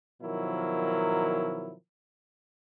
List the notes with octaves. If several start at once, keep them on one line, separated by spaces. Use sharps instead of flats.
B2 D#3 F3 F#3 E4 A#4